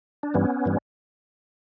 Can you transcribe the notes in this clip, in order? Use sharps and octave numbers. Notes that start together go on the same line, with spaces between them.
D4
G2 E3 G3 B3 C#4
G2 E3 G3